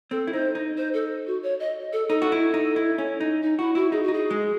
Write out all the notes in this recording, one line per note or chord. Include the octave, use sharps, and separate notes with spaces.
C4 A4
E4
D#4 C5
D#4
C5
A4
F#4
C#5
D#5
A4
D#4 A4
F#4
E4
D#4
E4
C#4
D#4
D#4
E4 F#4
E4 F#4
D#4 G#4
F#4
D#4
G#4
G#3